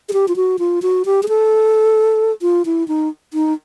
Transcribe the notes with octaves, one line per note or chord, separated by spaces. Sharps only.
G#4
G4
F4
F#4
F4
F#4
G4
G#4
A4
F4
E4
D#4
D#4